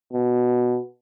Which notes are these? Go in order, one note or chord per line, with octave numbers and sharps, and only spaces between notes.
B2